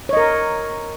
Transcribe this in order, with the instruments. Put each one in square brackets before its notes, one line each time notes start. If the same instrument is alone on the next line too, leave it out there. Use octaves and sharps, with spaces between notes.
[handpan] C#5
D#5
A#4